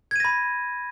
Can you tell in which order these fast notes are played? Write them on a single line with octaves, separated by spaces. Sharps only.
G#6 D#7 A#6 B5